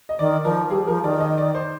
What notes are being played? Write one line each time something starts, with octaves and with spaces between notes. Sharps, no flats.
D#5
D#3 D5
F3 A#4
G3 G#4
F3 A#4
D#3 D5
D#5
D5
C5